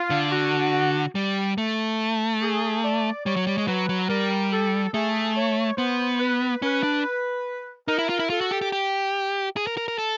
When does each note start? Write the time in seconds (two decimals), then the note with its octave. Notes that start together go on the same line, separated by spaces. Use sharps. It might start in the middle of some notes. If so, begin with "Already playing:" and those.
Already playing: F4
0.10 D3
0.31 F#4
1.15 G3
1.58 A3
2.42 G#4
2.83 D5
3.26 G3 C#5
3.36 F#3
3.47 G3
3.58 G#3
3.68 F#3 B4
3.89 F#3
4.09 G3 A#4
4.52 A4
4.94 A3 G#4
5.36 C#5
5.77 B3 C5
6.20 B4
6.62 C#4 B4
6.83 D4
7.88 D#4 A#4
7.99 E4
8.09 F4
8.19 E4
8.30 F4 A4
8.41 F#4
8.51 G4
8.61 G4
8.72 G4
9.56 G#4
9.67 A#4
9.77 A#4
9.88 A#4
9.98 A4